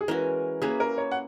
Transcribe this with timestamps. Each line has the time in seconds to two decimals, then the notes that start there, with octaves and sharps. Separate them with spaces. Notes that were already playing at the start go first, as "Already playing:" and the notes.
0.01 G#4
0.08 E3 G#3 C#4 F#4 A#4
0.62 A#3 C#4 E4 G#4 B4
0.80 A#4
0.98 C#5
1.12 F#5